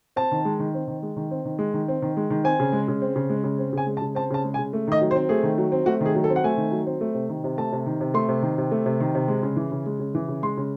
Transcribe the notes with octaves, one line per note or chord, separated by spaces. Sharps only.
C4 A5
D#3
G#3
D#3
C4
D#3
G#3
D#3
C4
D#3
G#3
D#3
C4
D#3
G#3
D#3
C4 G#5
C#3
G#3
C#3
C4
C#3
G#3
C#3
C4
C#3 G#5
G#3
A5
C#3
C4 A5
C#3 A5
G#3
G#5
C#3
A3
D#3 D#5
F#3
C5
C4
A3 G#4
D#3
F#3
C4
A3 F#4
D#3 G#4
F#3
A4
C4
F#5
A3 G#5
D#3
F#3
C4
A3
C3
D#3
C3
A3 A5
C3
D#3
C3
A3 C6
C3
D#3
C3
A3
C3
D#3
C3
G#3
C#3
E3
C#3
G#3
C#3
E3
C#3
G#3 C6
C#3